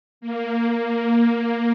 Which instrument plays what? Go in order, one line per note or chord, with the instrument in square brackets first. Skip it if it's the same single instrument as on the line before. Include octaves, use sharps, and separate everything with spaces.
[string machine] A#3